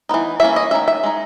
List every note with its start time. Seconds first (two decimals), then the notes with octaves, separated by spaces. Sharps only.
0.09 E3 B3 D#4
0.40 E3 A#3 C#4 E5
0.56 D#5
0.71 D#3 A#3 C#4 E5
0.88 E5
1.03 G#3 D#4